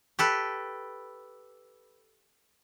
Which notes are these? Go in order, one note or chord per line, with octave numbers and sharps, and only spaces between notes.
G4 A4 B4